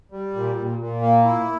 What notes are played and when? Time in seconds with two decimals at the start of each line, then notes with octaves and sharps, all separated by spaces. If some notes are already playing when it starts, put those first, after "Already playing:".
0.12 G3
0.34 A#2
0.57 A#2
0.79 A#2
1.01 A#3
1.24 E4